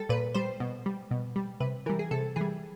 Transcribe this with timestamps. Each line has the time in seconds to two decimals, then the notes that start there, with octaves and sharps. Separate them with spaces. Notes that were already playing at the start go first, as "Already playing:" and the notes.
Already playing: G3 A4
0.09 A#2 B4
0.34 G3 C5
0.60 B2
0.86 G3
1.11 B2
1.36 G3
1.60 C3 B4
1.86 E3 A#4
1.89 G3
1.99 G#4
2.11 C3 A4
2.36 E3 G3 G#4